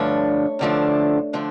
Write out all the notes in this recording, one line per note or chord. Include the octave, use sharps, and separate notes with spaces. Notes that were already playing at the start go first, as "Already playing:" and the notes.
Already playing: G2 D3 F3 A3 D4 C#5
G2 D3 F3 A3 D4
D3 F3 A3 D4